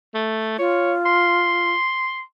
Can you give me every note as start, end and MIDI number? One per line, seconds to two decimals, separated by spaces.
0.14 0.58 57
0.59 1.72 65
0.59 0.93 73
1.06 2.21 84